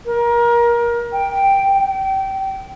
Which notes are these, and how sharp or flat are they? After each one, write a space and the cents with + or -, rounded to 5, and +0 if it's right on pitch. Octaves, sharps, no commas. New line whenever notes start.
A#4 +25
G5 +0
G5 -25